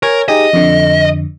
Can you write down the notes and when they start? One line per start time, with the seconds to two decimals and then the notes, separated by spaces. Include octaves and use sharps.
0.03 A#4 C#5 G#5 G#6
0.28 D#4 G4 G#4 D#5
0.53 F2 D3